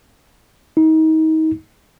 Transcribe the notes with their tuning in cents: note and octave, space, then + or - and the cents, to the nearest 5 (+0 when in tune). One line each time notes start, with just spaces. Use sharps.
D#4 +30